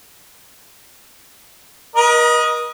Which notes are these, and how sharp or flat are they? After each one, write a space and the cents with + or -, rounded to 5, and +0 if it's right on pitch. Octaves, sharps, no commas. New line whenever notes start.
A#4 +45 D#5 +0